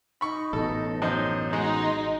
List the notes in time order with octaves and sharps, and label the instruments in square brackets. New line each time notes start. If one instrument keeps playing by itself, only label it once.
[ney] D#4 [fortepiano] B5 C#6
[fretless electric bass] A1 B2 [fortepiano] A4
[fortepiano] F#2 D#4 C5 [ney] C#5
[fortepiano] G#3 F#4 [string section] D#4 [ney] C6